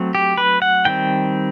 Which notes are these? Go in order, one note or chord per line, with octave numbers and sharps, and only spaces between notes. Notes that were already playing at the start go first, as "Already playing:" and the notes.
Already playing: F#3 A3 C4
G4
B4
F#5
D#3 G3 C4 G5